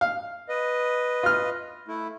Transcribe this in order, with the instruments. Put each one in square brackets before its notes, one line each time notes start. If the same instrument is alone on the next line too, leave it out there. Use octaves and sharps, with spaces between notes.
[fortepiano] F5
[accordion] B4 D#5
[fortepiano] F4 F6
[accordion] A3 E4